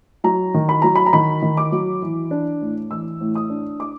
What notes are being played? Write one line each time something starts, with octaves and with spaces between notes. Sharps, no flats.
F#3 A#5
D#3
B5
F#3 A#5
B5
A#5
D#3 B5
D#3
D6
F#3
E3
D4
A2
E3 E6
A2
D#6
D4
D6